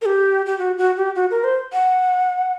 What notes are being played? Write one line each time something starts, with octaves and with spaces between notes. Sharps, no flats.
A#4
G4
G4
F#4
F#4
G4
F#4
A#4
C5
F#5